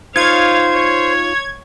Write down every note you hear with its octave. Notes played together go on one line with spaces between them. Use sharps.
D#4 F4 C5 C#5 F5 G#6
C#5